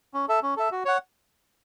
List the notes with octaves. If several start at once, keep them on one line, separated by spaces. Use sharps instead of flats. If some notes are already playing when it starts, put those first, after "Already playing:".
C#4
A4 E5
C#4
A4 E5
F#4
C#5 F#5